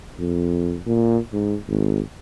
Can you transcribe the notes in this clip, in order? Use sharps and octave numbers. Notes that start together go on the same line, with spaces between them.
F2
A#2
G#2
G#1